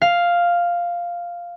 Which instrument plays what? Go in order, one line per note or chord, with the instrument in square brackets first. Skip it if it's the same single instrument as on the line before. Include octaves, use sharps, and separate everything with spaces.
[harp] F5